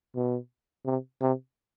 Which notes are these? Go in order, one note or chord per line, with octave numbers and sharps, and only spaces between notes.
B2
C3
C3